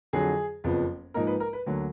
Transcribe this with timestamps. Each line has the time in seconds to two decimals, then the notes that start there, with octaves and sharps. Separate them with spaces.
0.13 F2 D3 F#3 G#4
0.64 F#1 F2 F3 B3
1.14 G#2 F3 A#3 D#4 A#4
1.27 B4
1.40 A#4
1.53 B4
1.66 D2 D3 F#3 A#3